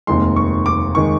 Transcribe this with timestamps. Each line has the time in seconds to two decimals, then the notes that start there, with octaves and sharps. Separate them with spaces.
0.07 F1 D#2 D#3 G#3 C6
0.36 C#6
0.66 D6
0.95 D#3 G#3 C#6